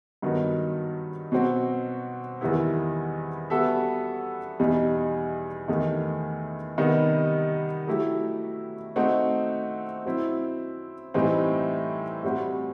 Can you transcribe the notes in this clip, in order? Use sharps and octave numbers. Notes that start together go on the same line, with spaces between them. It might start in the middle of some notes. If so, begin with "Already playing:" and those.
G2 D#3 F#3 B3 D#4
B2 F#3 C4 F#4
E2 D#3 G3 B3 E4
G3 B3 F#4 A4 E5
E2 B2 G3 D#4
E2 D#3 A3 D#4 G4
C3 D#3 G3 B3 D#4
F#3 A3 E4 G4
A3 C4 D#4 F#4
F#3 C4 E4
A2 E3 G3 C4 D#4
A2 G3 C4 F#4 C5